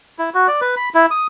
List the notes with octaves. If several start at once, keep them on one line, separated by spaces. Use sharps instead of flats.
E4
F#4
D5
B4
B5
E4
D#6